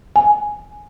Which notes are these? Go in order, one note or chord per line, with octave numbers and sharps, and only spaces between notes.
G#5